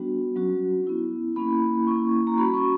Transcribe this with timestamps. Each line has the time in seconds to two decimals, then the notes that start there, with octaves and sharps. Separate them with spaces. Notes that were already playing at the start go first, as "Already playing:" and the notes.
Already playing: G3 B3 D4 F#4
0.36 F#3 C#4 F#4
0.87 B3 E4
1.36 A#3 C#4 E4 B5
1.87 A#3 C#4 E4 C#6
2.27 A#5
2.37 G3 C#4 F#4 B5
2.54 C#6